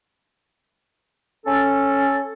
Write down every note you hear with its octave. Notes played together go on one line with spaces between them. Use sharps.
C#4 A4